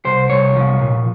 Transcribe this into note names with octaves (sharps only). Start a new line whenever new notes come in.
C2 C5
C2 C#5
F3
A#2